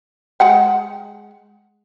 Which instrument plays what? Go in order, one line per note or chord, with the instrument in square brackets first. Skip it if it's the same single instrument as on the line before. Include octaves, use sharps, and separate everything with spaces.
[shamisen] G#3 F#5 G5